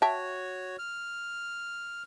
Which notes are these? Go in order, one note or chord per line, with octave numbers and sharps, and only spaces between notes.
F#4 C#5 E5 G5 A5
F6